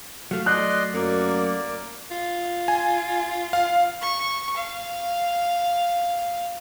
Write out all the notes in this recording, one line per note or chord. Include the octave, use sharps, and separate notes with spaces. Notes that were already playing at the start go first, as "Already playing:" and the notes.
F#3 A3 F5
D5 D#5 C6 F#6
F#2 A#3 D5
F4
G#5
F5
C#6
F5